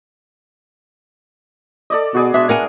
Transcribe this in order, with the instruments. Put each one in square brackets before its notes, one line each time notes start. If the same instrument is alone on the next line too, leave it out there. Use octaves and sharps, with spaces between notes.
[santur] A4 D5 D#5
[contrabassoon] B2 [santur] F#4 G#4 D5
[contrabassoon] B2 [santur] G#3 D4 [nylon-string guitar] E5
[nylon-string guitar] A#4 F#5 G#5